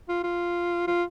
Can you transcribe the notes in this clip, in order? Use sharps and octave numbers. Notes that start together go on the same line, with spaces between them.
F4
F4
F4